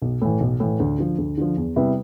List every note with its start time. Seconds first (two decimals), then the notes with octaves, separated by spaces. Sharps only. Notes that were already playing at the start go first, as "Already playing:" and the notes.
0.02 B1
0.22 A2 E3
0.40 B1
0.60 A2 E3
0.80 D2
0.98 D3 F3
1.18 D2
1.38 D3 F3
1.57 E2
1.76 C3 G3 B3 E4